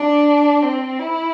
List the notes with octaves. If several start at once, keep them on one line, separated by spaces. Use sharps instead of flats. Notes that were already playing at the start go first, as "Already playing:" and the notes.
Already playing: D4
C4
E4